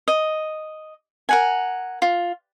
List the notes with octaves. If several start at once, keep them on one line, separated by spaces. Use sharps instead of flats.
D#5
A#4 F#5 G#5
F4